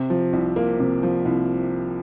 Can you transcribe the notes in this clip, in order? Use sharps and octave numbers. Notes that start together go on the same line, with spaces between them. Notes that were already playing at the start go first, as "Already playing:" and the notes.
Already playing: C3
F3
C2
A#3
C3
F3
C2